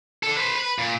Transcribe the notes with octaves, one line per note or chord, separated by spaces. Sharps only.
D3 A4
B4 C5
B4
A#2